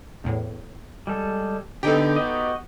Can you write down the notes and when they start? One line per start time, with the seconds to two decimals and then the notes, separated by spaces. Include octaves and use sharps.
0.24 E2 A2
1.07 G3 G#3 A4
1.83 D3 B3 D#4 G4 A4 G5
2.16 F#4 D#5